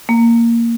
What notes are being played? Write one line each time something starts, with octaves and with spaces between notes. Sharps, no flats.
A#3